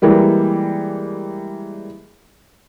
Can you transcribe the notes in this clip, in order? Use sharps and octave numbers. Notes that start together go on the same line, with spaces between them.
E3 G3 G#3 A#3